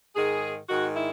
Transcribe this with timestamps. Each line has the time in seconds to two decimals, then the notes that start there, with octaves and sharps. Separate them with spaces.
0.16 G#2 D#3 G#4
0.68 G#2 D#3 F#4
0.94 E4